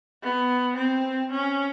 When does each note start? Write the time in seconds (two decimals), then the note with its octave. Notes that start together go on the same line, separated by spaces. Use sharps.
0.22 B3
0.76 C4
1.31 C#4